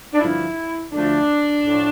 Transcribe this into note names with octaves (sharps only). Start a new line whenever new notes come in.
D4
G2 D3 F3 E4
D2 D3 F3 A3 D4
A2 F3 A3